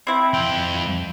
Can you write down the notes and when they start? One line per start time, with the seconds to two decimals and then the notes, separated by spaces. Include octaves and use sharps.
0.07 C4 E4
0.34 F2 G5